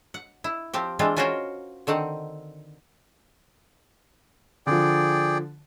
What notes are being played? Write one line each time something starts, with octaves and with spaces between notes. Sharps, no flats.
F#5
E4
F3 C4 G4
E3 G#3 C4 D4 F4
C#4 F4 F#4 A#4 C5 C#5
D3 D#3 C4 F#5
D3 F3 G#4 D5 G5